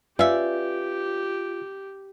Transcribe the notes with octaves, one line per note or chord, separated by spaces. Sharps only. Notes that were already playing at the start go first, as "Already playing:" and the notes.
C#4 F4 G4 B4 D5 E5 F5